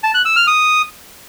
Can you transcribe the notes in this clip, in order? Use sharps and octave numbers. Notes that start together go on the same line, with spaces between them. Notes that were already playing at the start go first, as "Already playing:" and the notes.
A5
F#6
E6
F6
D#6